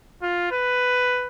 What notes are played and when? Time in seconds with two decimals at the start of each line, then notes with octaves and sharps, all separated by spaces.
0.22 F4
0.51 B4